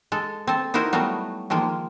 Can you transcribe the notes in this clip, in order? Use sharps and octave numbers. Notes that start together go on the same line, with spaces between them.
G#3 A4
C4 A4
D#4 E4 F#4 A#4 C5
F#3 G3 A3 B3 F#4
D#3 F3 G#3 A#3